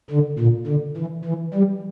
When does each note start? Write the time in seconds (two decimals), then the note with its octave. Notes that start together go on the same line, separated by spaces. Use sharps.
0.10 D3
0.39 A#2
0.67 D3
0.97 E3
1.24 E3
1.53 G3